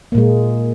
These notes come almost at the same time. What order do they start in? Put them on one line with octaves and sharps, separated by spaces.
A#3 A#2 G#3